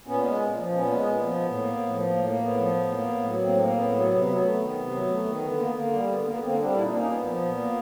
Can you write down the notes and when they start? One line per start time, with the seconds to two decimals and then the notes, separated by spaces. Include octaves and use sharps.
0.07 A#2 B3 C#4
0.24 G#3
0.41 A#2
0.57 F3
0.74 A#2 B3 C#4
0.91 G#3
1.07 A#2 B3
1.24 F3
1.41 A2
1.57 A#3
1.74 A2
1.90 F3
2.08 A2 A#3
2.24 A#3
2.41 A2 B3
2.57 F3
2.74 A2
2.90 A#3
3.07 A2
3.24 F#3
3.41 A2 A#3 C4
3.58 A#3
3.74 A2 B3
3.91 F#3
4.08 C3 B3
4.25 F#3
4.41 A3 B3
4.57 D#3
4.74 C3
4.91 F#3
5.08 A3
5.24 D#3
5.41 D3 B3
5.58 A#3
5.74 D3 A#3
5.92 G3
6.08 D3 B3
6.25 A#3 B3
6.41 D3 A#3 C4
6.58 G3 C4 D4
6.75 A#2 E4
6.82 D#4
6.90 A#3 D4
6.97 C#4 D#4
7.08 A#2 B3
7.25 F3
7.42 A#2
7.58 A#3